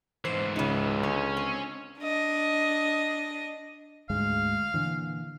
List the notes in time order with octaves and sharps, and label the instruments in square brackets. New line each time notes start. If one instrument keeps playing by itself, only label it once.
[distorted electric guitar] G#2 E3 [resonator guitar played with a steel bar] C5
[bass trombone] C#2 [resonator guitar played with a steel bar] C#3 D#4
[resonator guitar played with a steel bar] D3 [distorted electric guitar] C#4 C#5
[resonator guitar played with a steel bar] C4
[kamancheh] D4 D#5
[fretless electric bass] D2 G#2 G#3 [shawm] F5
[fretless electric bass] A#2 D3 E3